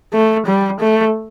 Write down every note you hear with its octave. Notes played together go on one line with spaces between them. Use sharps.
A3
G3
A3